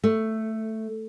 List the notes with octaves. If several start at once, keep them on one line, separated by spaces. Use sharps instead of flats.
A3